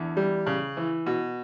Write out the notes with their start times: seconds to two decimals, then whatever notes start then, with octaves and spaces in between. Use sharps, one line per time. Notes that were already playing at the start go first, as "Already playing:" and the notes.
Already playing: E2 D3
0.17 G3
0.46 C#3
0.77 E3
1.06 B2